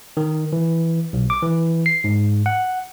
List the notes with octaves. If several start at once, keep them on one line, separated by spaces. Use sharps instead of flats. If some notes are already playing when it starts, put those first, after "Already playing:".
D#3
E3
B1
D6
E3
C7
G#2
F#5